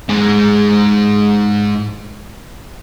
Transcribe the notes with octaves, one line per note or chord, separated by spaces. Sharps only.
G#2 G#4